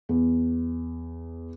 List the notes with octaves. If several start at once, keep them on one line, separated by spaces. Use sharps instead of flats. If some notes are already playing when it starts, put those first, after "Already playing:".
E2